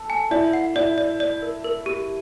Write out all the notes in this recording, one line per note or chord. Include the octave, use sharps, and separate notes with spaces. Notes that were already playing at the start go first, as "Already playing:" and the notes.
Already playing: A4
G#5
E4 D5
F#5
E4 D5
D5
D5
A#4
A#4
G4